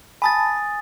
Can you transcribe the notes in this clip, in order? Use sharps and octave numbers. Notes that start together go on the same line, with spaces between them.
G#5 A5 B5 D#6 A6